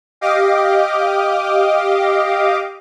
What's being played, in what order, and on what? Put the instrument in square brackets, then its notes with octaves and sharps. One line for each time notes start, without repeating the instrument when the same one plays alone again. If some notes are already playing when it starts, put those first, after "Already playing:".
[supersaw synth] G4 D#5 F5 D6